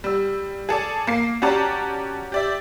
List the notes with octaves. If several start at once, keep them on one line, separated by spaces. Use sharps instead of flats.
G3 E6
G#4 A4 D5
A#3 C7
C#4 F#4 G4 D5 A5 A#5
G4 D5 E5